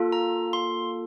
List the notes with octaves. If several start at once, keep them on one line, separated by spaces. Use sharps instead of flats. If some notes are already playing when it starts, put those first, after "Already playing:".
Already playing: A#3 F4 A4
A#5
C6